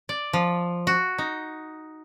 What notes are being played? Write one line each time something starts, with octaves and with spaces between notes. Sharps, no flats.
D5
F3
F#4
D#4